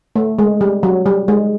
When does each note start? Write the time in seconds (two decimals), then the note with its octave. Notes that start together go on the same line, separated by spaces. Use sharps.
0.16 A3
0.39 G#3
0.61 G3
0.83 F#3
1.06 G3
1.28 G#3